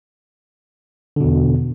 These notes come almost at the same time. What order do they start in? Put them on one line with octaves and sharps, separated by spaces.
D3 B2 E2